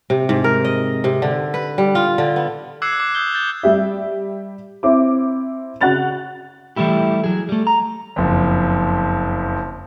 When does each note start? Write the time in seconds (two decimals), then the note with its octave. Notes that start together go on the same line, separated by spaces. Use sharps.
0.10 C3
0.29 G#2
0.44 A#4
0.65 D#5
1.04 C3
1.22 D3
1.54 B4
1.78 G3
1.95 F4
2.18 D3
2.36 B3
2.82 D6 E6 F#6 G#6 C7 C#7
3.00 D6
3.15 D#6 E6 G6 G7
3.34 G6 A6 G7
3.63 G3 G4 E5
4.83 C4 E4 E5 D6
5.81 C#3 F#4 F#5 F#6 A6 F7
6.76 E3 G3 A3 E4 G4
7.24 F#3 G#4
7.49 G3 A3
7.67 A#5
8.16 F#1 F2